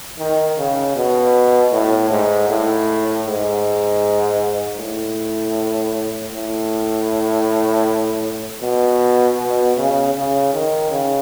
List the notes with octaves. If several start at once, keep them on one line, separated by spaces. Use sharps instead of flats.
D#3
C#3
B2
A2
G#2
A2
G#2
A2
A2
B2
B2
C#3
C#3
D#3
C#3